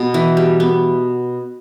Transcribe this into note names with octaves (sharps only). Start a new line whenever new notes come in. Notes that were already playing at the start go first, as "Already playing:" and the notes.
Already playing: B2 B3
E3
G3
B3